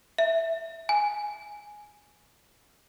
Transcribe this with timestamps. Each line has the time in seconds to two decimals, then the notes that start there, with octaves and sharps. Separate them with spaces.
0.18 E5
0.89 G#5